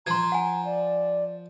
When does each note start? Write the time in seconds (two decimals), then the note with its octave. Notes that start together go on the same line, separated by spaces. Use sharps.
0.07 F3 C5 A#5 C6 G#6
0.32 F#5 G#5
0.65 D5